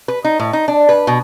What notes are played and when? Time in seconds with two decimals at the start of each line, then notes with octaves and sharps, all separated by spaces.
0.08 B4
0.24 D#4
0.40 A2
0.53 D#4
0.68 D4
0.89 B4
1.07 B2